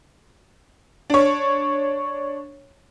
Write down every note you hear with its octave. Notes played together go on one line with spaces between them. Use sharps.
D4 C#5